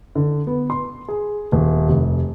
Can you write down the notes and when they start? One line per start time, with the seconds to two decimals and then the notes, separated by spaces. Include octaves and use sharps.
0.15 D3
0.47 B3
0.70 C6
1.08 G#4
1.52 D#1
1.88 F1